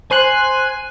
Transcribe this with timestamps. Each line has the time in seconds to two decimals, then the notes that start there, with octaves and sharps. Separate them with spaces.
0.11 C5 G#5 C6 F#6